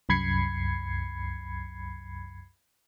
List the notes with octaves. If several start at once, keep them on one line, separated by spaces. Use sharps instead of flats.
C2 F#2 B5 G#6 C7 C#7